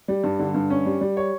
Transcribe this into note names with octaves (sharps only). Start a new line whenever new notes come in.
G3
G2
D3
G2
C#4
G3
G3
C#5